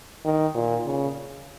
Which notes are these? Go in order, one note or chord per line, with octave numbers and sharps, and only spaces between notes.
D#3
A#2
C#3